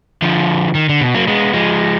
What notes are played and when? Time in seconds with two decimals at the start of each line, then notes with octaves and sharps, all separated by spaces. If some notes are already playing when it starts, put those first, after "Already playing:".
0.22 D3 F3
0.75 D#3
0.89 D3
1.01 B2
1.14 F#3 A#3
1.27 G#3 B3
1.54 F3 G#3